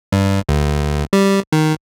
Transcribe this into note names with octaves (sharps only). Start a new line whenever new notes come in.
G2
D2
G3
D#3